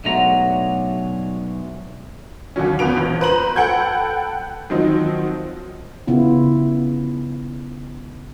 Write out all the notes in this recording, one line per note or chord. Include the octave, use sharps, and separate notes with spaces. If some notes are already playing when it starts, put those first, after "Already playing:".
B1 F#3 G#3 A3 D4 A#5
D#2 D3 F#3 C#4
E2 B3 F4 B4 D7 F7
A#1
B4 C5 A#5 F#7
A4 F#5 G5 B5 G6 G#6
D#3 F3 F#3 C4 D#4
C#3 B3 E4 F4